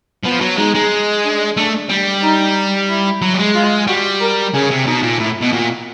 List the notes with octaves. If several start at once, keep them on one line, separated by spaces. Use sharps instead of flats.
F3 B3
F#3
G#3 D#4
G#3
D4
A3 D4
G3
D#4
E4
F#3
G3
G#3
F4
G3 F#4
A#4
C#3 G#4
C3
B2 D#4
A#2
A2 E4
B2
A#2 F#4